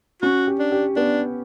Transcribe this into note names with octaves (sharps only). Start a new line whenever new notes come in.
C#4 F#4
G4
D4
G4
B3 D4